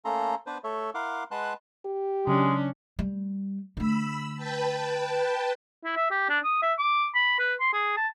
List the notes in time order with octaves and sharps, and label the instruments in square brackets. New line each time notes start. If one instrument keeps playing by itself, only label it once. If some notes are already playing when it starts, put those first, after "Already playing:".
[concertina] A3 A#3 C#4 A4 A#5 C6
B3 D4 B4 C5
A3 A4 C#5 E5
E4 A#4 F5 F#5 C6 D6
G#3 B4 F#5 A5 C6 F#6
[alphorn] G4
[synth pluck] C#3 F#3 [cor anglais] G#3 [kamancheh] C#4 D4
[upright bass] G3
[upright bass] D3 A3 [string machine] B5 E6
[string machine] B4 G5 A5
[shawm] E4
E5
G4
D4
D#6
E5
D6
B5
B4
C6
G#4
A5